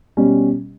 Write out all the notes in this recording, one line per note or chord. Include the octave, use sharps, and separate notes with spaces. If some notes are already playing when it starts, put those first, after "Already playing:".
B2 G3 C#4